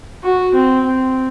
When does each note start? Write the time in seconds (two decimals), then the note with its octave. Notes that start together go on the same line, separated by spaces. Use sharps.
0.23 F#4
0.54 C4
0.87 C4